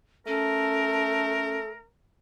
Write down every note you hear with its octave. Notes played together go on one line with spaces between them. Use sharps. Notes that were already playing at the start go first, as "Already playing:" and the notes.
A3 C#4 A4 A#4